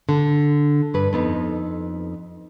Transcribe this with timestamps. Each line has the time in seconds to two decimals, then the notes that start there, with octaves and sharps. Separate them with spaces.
0.09 D3
0.94 G2 B4
1.13 F2 B3 D#4